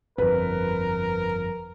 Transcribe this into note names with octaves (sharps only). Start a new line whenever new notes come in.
G1 F2 A#4 B4